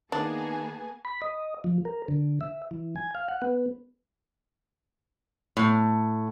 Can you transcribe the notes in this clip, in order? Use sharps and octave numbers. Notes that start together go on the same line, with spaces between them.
D#3 A#3 B3 D4 G#4 G#5 A5
B5
D#5
F3
A#4
D3
E5
E3
G#5
F5
F#5
B3
A2